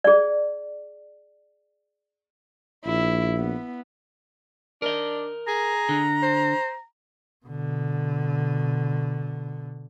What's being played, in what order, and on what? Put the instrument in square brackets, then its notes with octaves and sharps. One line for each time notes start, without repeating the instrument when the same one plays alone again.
[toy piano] G#4 D5
[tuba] A#1 [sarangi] E4
[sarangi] B3
[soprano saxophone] D4 [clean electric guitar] A#4 D#5
[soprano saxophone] G#4 [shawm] A#5
[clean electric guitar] D3
[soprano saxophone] C5
[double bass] B2 D3